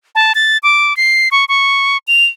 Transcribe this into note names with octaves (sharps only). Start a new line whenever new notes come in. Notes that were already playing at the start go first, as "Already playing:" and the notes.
A5
A6
D6
C7
C#6
C#6
F7